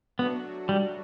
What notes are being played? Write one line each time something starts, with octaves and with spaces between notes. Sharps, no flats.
F#3 A3 B3 D4 F#4
G3